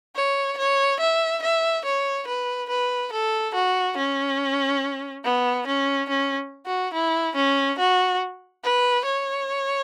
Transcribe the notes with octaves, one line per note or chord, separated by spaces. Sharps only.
C#5
C#5
E5
E5
C#5
B4
B4
A4
F#4
C#4
B3
C#4
C#4
F#4
E4
C#4
F#4
B4
C#5